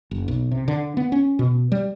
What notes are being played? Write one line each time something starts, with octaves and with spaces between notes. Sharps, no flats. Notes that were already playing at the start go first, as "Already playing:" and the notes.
F#1
B1
C3
D3
B3
C#4
B2
G3